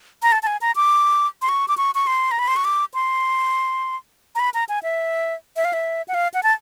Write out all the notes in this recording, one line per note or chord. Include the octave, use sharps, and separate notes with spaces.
A#5
A5
A5
G#5
A#5
D6
C6
C#6
D6
C#6
C#6
C6
A#5
B5
C6
C#6
D6
C6
A#5
B5
A#5
G#5
E5
E5
F5
E5
F#5
F5
F#5
A5